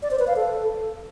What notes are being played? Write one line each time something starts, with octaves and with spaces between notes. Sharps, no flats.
D5
C5
B4
F5
A4